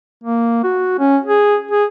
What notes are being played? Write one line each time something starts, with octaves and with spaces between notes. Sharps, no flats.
A#3
F#4
C#4
G#4
G#4